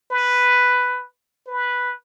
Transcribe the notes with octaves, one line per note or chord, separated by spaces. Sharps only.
B4
B4